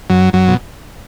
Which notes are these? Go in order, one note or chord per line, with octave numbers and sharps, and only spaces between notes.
F#2 F#3
F#2 F#3
B2